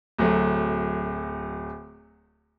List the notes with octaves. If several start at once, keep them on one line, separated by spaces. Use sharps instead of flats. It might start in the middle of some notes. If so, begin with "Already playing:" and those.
D1 F#3 A3